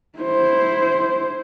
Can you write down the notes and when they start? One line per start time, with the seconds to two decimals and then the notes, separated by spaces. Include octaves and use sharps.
0.19 E4 C5